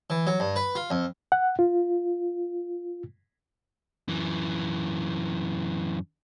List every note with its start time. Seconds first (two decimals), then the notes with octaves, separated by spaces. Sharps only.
0.10 E3
0.27 F#3
0.40 G2
0.56 B4
0.75 F4
0.90 F2
1.32 F#5
1.59 F4
4.08 F#2 E3